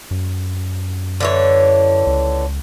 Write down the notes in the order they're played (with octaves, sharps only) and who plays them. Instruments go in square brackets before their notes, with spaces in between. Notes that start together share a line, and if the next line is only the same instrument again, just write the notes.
[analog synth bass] F#2
[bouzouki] D3 E3 C#5
[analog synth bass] C#2